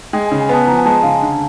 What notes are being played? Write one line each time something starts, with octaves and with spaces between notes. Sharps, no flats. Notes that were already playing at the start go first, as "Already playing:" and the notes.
G#3 G5
G#5
C#3
G#5
B3 A5
F3 A#5
G#5
G#3 A5
C#3 F5
D3